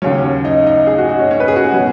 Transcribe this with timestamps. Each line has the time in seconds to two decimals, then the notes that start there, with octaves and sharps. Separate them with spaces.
0.02 D#2 C#3 F#3 C#4
0.45 D#4
0.67 D#4
0.87 G#4
0.98 F#4
1.09 D#4
1.19 C#4
1.31 C#4
1.40 B4
1.48 G#4
1.56 F#4
1.65 D#4
1.73 B2 F#3 C#4